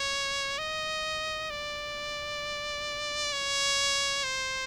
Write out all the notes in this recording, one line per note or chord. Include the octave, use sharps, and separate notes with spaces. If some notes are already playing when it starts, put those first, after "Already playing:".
Already playing: C#5
D#5
D5
C#5
C5